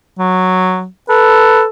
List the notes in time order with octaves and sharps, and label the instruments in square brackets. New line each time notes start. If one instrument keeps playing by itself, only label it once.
[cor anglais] F#3
[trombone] A4 [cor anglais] B4